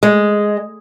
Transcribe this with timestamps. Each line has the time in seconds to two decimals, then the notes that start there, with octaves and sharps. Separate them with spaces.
0.03 G#3